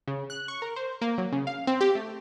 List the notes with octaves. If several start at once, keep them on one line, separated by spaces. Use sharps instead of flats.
C#3
F#6
C#6
A#4
C5
A#3
F#3
C#3
F5
C4
G4
A3